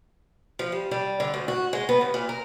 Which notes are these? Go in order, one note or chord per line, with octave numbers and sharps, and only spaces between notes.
F3
G3
G3
D3
D2
F#4
G#3
B3
D#2
A#2
A#4